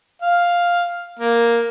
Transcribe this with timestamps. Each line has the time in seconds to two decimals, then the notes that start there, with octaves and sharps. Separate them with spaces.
0.22 F5
1.20 A#3